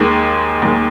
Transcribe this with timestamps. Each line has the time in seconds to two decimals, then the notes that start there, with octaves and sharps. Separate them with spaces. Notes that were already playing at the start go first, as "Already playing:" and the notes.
Already playing: D#2 D#3 G#3
0.62 D#2 D#3 G#3